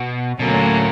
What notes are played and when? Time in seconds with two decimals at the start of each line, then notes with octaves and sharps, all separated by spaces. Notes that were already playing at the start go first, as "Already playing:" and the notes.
Already playing: B2
0.39 D2 B2 D3 F#3 A#3 C#4
0.53 A#2
0.66 A2